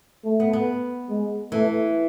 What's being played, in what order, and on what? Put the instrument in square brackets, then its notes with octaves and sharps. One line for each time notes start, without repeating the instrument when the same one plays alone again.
[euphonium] A3
[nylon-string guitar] B3
B3
[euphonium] G#3
[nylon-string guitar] E3 [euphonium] A3